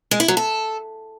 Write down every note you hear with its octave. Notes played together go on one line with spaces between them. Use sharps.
G#3
E4
F#3
A4